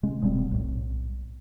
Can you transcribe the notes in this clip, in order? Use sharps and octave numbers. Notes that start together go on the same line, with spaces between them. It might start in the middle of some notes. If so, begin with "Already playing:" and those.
C3 G#3 C#4
D#1 B2 G3 C4
B1 A2